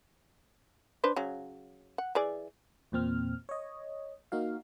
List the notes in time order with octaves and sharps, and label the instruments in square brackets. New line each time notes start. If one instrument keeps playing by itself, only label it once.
[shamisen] D4 B4 C5
C#3 F#3
F#5
E3 G#4 D5
[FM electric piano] E2 A#2 C4 F6
C#5 D#5
A#3 D#4 F#4 F5